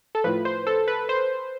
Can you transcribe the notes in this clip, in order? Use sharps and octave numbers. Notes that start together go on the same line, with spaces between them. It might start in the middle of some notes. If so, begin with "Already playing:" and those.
A4
A2 F3 B4
C5
A4
B4
C5